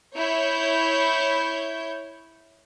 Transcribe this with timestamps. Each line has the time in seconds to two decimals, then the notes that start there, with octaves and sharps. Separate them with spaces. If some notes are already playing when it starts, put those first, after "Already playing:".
0.16 E4 C#5 G6